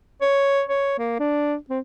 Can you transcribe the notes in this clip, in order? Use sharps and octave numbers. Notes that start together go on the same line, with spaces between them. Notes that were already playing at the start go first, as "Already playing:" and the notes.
C#5
C#5
A#3
D4
C4